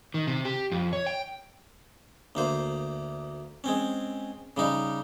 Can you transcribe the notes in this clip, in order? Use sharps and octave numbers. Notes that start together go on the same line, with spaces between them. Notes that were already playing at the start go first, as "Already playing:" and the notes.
D#3
C3
G4
F2
C#5
G5
D2 A#3 C5
G#3 C4 C#4
C#3 G3 D#4